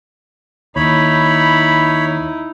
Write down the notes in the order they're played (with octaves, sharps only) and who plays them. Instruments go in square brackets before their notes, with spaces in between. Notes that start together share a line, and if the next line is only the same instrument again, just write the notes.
[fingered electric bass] D#2 [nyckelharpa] D#4 E4 [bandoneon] C#5 B5